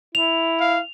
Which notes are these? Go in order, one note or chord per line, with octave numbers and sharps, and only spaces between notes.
E4 F7
F5